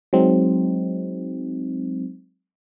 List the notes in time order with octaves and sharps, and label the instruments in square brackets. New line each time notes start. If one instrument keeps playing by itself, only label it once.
[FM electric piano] F#3 G#3 C4 D#4